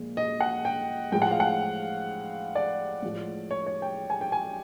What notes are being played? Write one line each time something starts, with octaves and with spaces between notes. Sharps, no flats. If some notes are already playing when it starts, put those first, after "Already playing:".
Already playing: A#2 F3 G#3
D#5
F#5
G5
A2 F3 G#3 G5
F#5
F5
F#5
D5
A2 F3 G#3
C#5
C#5
G5
G#5
G5
G#5